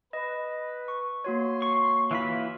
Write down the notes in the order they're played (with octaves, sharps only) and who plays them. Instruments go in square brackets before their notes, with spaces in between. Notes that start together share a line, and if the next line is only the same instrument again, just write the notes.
[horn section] B4 [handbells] D#5
[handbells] C#6
[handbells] A#3 F#4 C#5 [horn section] C6
[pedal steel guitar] C#6
E3 F4 B5